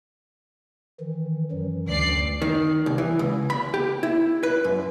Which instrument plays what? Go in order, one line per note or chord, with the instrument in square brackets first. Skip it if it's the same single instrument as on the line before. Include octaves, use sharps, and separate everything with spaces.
[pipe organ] D#3 E3
F#2 E3 F#3
[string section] D2 D5 C7
[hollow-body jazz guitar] D#3
C2
E3
C#2
B5
G4
E4
B4
F#2